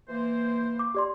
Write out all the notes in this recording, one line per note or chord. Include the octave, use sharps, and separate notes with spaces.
E3 A#3 C5
D6
G4 D5 C6